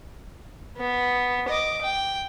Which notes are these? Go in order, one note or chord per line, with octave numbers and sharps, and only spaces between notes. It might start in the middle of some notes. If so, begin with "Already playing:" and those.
B3
D#5 D6
G5